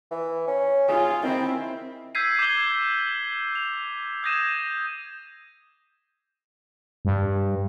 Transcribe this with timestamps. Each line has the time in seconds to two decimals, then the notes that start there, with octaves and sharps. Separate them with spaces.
0.11 E3
0.48 C#4
0.89 F4 G#4
1.23 D#3 C4 E4
2.15 E6 G6 G#6 B6 C7 D#7
2.39 D6 G6 G#6 C7 F#7 G7
3.55 F7
4.23 D#6 G6 G#6 A#6 D#7 E7
7.05 G2